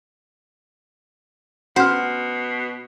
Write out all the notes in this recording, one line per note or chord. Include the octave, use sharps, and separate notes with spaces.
B2 C#4 F#4 C5 F#5 F6